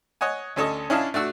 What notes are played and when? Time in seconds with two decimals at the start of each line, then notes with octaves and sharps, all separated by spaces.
0.21 C#5 D#5 F#5 G#5
0.56 D2 C#4 A4 C#5 D#5
0.90 C#4 D4 E4 D#5 F5 A5
1.14 A3 D4 F#4 E6